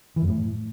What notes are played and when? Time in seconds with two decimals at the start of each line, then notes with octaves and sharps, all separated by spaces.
0.16 E3
0.22 F#2
0.28 A2